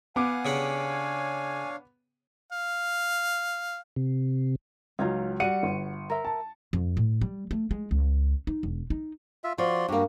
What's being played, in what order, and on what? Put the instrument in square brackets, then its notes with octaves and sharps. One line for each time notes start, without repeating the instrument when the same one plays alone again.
[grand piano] B3 D6 [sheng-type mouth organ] F5 F#5 [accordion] G#5
[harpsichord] C#3 G4 F#5 [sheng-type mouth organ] D4 C#5 F5
[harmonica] F5
[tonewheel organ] C3
[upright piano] C#2 F#3 [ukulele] C#4 D#4 F4
[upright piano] G3 C#7 D#7 [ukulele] F#4 F#5
[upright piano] G1
[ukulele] A#4 E5
[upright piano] A5
[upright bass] F2
A2
G3
A3
G#3
C#2
D#4
E1
D#4
[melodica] F4 E5
[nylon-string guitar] F3 [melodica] F#4 D5 C6
[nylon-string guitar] G2 A#3 [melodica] F#4 G4